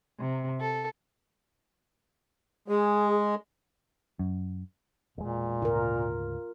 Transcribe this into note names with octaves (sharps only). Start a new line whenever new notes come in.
C3
A4
G#3 G#4
F#2
E1 A#2 G#3
D2 G#2 C#3 F4 A#4